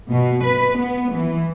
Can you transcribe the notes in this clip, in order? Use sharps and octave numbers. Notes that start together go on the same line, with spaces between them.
B2
B4
B3
E3